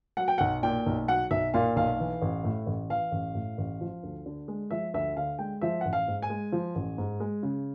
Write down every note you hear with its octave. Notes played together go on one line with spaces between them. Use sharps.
F#3 F#5
G5
B1 F#5
A#2 G5
B1
F#3 F#5
B1 E5
A#2 F5
B1 F5
E3
A1
A2
A1
E3 F5
A1
A2
A1
F3
D2
D3
G#3
F3 E5
D2 E5
D3 F5
G#3 G5
F3 E5
A1 F#5
F5
G#2
G#5
G#3
F3
A1
G#2
G#3
C#3